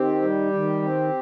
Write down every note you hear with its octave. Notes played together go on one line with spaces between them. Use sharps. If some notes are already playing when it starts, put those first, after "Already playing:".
Already playing: D#3 C4 G4
G3
D#3
C4